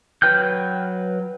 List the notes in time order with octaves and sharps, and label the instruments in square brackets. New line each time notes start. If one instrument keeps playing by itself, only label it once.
[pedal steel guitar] F#3 B4 G5 F6 G6